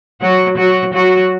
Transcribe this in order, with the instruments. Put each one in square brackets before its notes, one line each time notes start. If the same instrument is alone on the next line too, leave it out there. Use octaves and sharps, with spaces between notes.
[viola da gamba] F#3 F#4
F#3 F#4
F#3 F#4